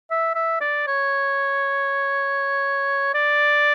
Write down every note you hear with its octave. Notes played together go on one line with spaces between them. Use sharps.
E5
E5
D5
C#5
D5